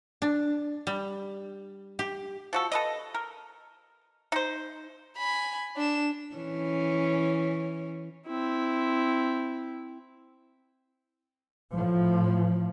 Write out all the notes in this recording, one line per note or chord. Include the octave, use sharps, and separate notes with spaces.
D4
G3
G4
F3 F#4 A4
A4 B4 D#5
A#4
D#4 C5
G#5 B5
D4 E7
E3 C#4
C4 E4
A2 F3